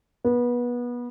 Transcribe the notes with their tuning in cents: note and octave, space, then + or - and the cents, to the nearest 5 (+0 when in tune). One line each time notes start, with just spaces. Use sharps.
B3 -25